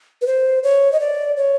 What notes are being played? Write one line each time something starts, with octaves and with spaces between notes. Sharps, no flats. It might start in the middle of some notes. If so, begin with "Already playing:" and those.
B4
C5
C#5
D#5
D5
C#5